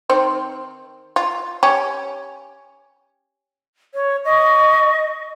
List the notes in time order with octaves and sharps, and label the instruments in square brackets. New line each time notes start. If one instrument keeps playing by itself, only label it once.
[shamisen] D#3 C4 C5
F4
C#4 G4
[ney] C#5
[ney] D#5 [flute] C#6